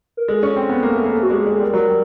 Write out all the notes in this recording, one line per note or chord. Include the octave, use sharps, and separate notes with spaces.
A#4
G#3 A4
C#4
C4
B3
A#3
A3
A#3
A3
F#4
G#3 G4
G#3 G#4
A4
G3 A#4
F#3
G3